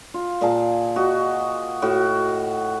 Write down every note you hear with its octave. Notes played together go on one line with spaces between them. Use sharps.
F4
A#2 F4 G#4 A5
F#4 D#5
A2 F#4